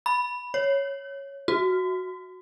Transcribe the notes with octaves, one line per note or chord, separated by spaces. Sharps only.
B5
C#5
F#4